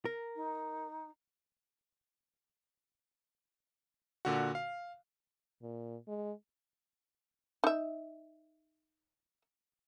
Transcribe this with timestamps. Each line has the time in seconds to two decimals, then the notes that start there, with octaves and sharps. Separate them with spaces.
0.05 A#4
0.35 D#4
4.25 A#2 D3 F#4
4.55 F5
5.62 A#2
6.08 G#3
7.64 D#4 E5